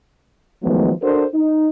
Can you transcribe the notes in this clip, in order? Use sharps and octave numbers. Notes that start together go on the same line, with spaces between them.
D#3 F3 F#3 G#3 A3 B3
D4 F#4 A4 A#4 C5
D#4